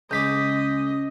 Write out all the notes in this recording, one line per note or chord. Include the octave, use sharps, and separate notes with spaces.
C#2 G#3 C#4 D#5 D6 G6 B6